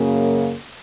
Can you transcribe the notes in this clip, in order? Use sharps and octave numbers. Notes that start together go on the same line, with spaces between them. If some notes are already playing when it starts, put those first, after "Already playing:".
Already playing: F#2 C#3 A#3